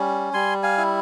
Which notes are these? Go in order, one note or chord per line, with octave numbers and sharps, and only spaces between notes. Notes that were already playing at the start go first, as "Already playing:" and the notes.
Already playing: G3 C#4
G3 G#5 C6
F5 G#5
E4